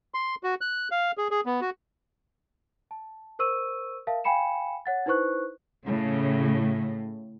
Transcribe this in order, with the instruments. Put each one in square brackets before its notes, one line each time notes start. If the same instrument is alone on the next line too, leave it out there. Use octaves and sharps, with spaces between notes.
[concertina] C6
F#4
F#6
F5
G#4
G#4
B3
F#4
[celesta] A5
A#4 C5 C#6 E6 D#7
A#4 E5 F5 A5
F5 G5 G#5 B5 C#7 E7
C#5 F#5 A6
D#4 E4 B4 C5 C#6 F#6
[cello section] A2 [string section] C#3